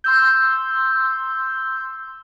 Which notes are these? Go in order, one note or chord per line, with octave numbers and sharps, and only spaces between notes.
C6 E6 G6